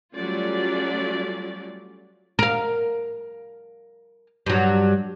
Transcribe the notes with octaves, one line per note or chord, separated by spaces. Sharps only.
F#3 G3 A3 C#4 F4 D5
A#4 F5
G2 F#3